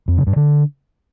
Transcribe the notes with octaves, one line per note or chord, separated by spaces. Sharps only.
F2
C#3
G2
D3